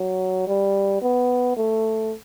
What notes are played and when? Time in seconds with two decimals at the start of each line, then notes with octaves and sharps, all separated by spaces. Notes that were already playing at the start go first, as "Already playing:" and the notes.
Already playing: F#3
0.47 G3
1.02 B3
1.57 A3